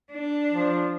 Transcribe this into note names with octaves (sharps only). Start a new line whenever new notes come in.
D4
F3